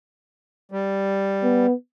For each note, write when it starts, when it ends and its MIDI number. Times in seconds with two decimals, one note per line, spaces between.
0.72 1.67 55
1.43 1.73 59